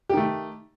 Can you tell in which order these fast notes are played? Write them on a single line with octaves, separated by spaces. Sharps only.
G4 D#3 A3